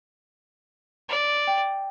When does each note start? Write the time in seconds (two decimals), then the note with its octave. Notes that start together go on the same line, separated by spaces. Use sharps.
1.09 D5
1.47 G5